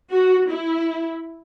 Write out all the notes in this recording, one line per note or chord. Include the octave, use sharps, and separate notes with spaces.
F#4
E4